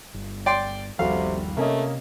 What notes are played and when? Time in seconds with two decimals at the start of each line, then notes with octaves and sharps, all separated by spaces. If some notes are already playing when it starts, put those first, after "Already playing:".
0.14 G1
0.46 D5 G5 C6
0.99 G1 D#2 C3 F3 G3 F#4 A4 F5
1.57 C3 A3 A#3 C#4 D#5